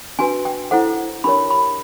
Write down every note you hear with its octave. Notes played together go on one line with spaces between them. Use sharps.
D4 F#4 B4 G#5
G5
E4 A4 C5 F#5
D4 G4 A#4 C#5 B5
B5